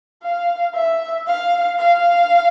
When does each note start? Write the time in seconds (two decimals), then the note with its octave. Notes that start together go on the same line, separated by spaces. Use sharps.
0.23 F5
0.74 E5
1.27 F5
1.79 F5